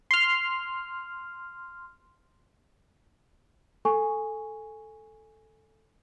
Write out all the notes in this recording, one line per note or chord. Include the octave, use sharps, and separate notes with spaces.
C6 F6
A4 G#5 C#6